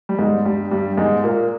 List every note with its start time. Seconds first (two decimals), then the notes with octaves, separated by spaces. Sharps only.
0.09 G3
0.19 G#2 G#3
0.45 G2 G3
0.71 G2 G3
0.98 G#2 G#3
1.24 A#2 A#3